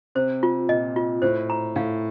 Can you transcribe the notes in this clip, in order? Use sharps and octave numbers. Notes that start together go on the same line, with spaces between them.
C3 C5
F4
A#2 D#5
F4
A2 C5
A#5
A2 F5